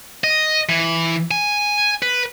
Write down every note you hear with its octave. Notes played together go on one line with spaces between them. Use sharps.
D#5
E3
G#5
B4